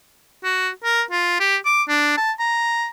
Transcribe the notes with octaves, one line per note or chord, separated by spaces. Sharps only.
F#4
A#4
F4
G4
D6
D4
A5
A#5